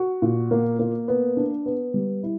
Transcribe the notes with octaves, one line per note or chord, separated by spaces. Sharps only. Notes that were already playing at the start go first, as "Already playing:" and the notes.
Already playing: F#4
A#2
A#3
A#3
B3
D4
B3
G3
E4